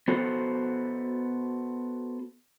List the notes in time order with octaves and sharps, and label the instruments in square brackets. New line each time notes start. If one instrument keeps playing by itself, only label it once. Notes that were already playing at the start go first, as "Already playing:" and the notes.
[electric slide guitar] B3 F#4 A4 C5